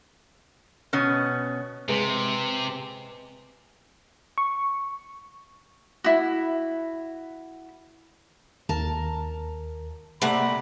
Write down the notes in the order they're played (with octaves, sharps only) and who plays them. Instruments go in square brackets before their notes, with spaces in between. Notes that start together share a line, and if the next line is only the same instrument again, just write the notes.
[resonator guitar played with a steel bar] B2 B3 C#4
[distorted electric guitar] C3 [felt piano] G#3 B4
[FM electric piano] C#6
[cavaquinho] E4 F#4
[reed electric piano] D#2 [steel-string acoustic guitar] A#4 A5
[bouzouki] C3 A#3 F#5 [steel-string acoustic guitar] A3 [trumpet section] D5 B5